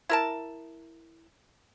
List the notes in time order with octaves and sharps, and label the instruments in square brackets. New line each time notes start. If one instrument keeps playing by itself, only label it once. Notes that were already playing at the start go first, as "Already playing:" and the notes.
[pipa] E4 A#4 A5